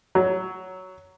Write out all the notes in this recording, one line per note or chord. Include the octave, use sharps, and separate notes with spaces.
F#3